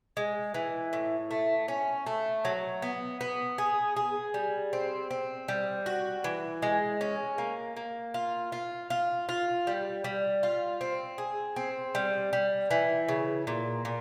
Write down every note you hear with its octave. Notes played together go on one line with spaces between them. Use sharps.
G#3
E3
A2
A3
C#4
A3
F#3
B3
B3
G#4
G#4
G3
C4
C4
G3
F#4
E3
G#3
C#4
A#3
A#3
F4
F4
F4
F4
G3
G3
F4
C4
G#4
C4
G3
G3
E3
C#3
A#2
A#2